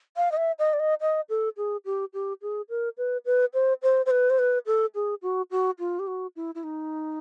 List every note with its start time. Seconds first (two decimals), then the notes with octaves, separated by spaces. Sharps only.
0.17 F5
0.32 D#5
0.37 E5
0.59 D#5
0.73 D5
0.80 D#5
1.01 D#5
1.29 A4
1.57 G#4
1.85 G4
2.14 G4
2.42 G#4
2.69 A#4
2.98 B4
3.26 B4
3.54 C5
3.82 C5
4.06 C5
4.11 B4
4.30 C5
4.39 B4
4.66 A4
4.95 G#4
5.22 F#4
5.51 F#4
5.79 F4
5.99 G4
6.07 F#4
6.36 E4
6.55 E4
6.64 D#4